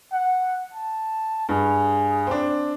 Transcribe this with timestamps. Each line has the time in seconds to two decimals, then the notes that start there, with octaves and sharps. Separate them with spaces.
0.12 F#5
0.74 A5
1.49 G2 G#4
2.27 C4 D4